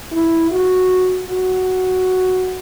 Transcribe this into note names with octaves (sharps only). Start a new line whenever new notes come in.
E4
F#4
F#4